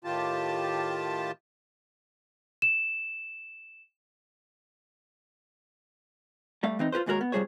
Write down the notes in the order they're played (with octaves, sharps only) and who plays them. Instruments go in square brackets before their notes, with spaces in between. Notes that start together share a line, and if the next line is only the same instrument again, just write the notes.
[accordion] A2 D#3 F4 G4 A5
[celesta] E7
[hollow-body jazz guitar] G3 A3 F5
E3 C4 D#4
F4 G4 B4 C5
D#2 G#2 G#3 F#4 A#4 C#5
B3
F2 F3 G3 G#4 C5 C#5